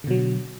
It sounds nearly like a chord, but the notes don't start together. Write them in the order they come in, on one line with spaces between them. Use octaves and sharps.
D3 B2 F#3